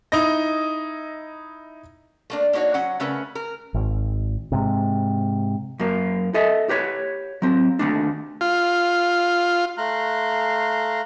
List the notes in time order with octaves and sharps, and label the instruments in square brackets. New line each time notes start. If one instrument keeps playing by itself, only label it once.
[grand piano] D#4 E4 D#5 A#6
[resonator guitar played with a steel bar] A3 A#3 D4
A#3 D4 D#4 F#4 C#5
F#3 C#4 F#5
C#3 A3 C#4 A#4 B4
A#4
[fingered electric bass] G#1
G#2 C3
[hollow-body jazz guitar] F#2 A#3
A4 D#5 E5
G4 B4 C#5
F#3 C4
D#2 A3 D4
[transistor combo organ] F4
[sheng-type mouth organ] A3 F5 A#5 C6 F#6